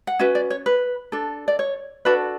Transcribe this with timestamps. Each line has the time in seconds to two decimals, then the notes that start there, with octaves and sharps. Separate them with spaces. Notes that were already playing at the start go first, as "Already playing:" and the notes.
0.07 F#5
0.19 C#4 F#4 B4 E5
0.35 D5
0.50 C#5
0.66 B4
1.12 D4 A4
1.48 D5
1.59 C#5
2.05 D4 F#4 A4 B4